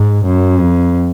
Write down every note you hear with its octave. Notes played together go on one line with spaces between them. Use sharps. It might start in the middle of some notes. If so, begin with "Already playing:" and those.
Already playing: G#2
F#2
F2